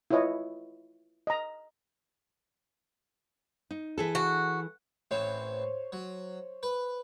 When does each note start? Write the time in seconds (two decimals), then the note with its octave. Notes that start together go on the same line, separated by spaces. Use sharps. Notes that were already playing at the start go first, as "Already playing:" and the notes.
0.10 E4 F4 B4 C#5 D#5
1.27 D#5 A#5
3.71 D#4
3.98 E3 G#4 A4
4.15 F#4
5.11 A1 E3 C4 C5 C#5
5.92 F#3
6.63 B4